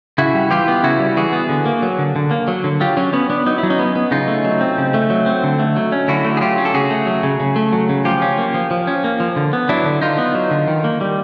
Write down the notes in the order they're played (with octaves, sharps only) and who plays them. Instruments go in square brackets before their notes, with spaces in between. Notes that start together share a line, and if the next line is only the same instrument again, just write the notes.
[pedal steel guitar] C#3 E4 F#4
G3
E3 F4 G4
B3
C#3 E4 F#4
G3
E3 F#4 G#4
B3
D3
A#3
F#3
D3
D3
A#3
F#3
D3
F#3 F4 G4
F#3 C#4
B3 C#4
B3 D4
F#3 D#4
E4
F#3
C#4 D#4
B3
B3
C#3 D#4 F4
A3
F#3
C4
C#3
A3
F#3
C4
D3
A3
F#3
C#4
D3 E4 F#4
A3
G#4
F#3 F4 G4
C#4
A4
C#3 F#4 G#4
A3
F#3
C#3
C#3
A3
F#3
C#3
F3 F4 G4
C#4
A#3
F3
F3
C#4
A#3
F3
D3
B3
F#3 D4 E4
D3
D3 D#4 F4
B3
F#3
D3
D#3
A#3
G3